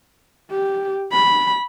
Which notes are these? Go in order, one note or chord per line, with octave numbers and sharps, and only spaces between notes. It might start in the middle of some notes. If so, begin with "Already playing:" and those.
G4
B5